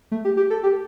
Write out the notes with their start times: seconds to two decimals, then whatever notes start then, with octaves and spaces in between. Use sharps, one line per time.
0.12 A3
0.25 G4
0.37 G4
0.50 A4
0.63 G4